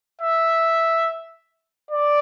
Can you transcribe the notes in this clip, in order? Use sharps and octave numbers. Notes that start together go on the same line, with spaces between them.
E5
D5